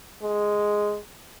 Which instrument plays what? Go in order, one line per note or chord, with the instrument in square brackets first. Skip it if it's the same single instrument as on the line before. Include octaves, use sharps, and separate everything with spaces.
[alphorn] G#3